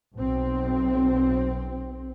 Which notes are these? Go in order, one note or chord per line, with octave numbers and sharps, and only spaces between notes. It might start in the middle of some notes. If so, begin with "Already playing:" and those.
B1 C4